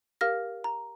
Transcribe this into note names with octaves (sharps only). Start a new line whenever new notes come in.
G4 A#4 F5 F6 A#6
A#5